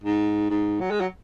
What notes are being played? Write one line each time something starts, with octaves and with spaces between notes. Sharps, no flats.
G#2
G#2
F#3
G#3
F#3